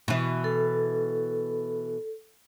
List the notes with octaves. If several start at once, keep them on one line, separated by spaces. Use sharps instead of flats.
B2 E3
A4